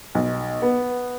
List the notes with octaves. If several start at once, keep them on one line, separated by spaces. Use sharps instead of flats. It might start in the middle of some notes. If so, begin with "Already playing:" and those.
B1
B3